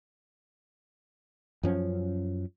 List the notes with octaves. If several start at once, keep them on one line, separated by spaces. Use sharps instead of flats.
F#2 F3 C#4